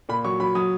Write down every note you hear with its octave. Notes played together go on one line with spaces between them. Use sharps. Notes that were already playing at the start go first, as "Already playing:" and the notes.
A#2 B5
F#3 C#6
F#3 B5
F#3 D#6